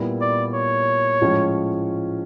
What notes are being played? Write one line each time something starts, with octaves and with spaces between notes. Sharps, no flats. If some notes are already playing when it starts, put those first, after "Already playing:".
Already playing: A#2 G3 B3 E4
D5
C#5
A2 F3 G#3 C#4